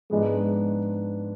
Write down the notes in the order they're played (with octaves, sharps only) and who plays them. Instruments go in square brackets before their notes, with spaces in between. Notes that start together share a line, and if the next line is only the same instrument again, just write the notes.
[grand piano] G#2 F3 B3 D4 [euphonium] G#3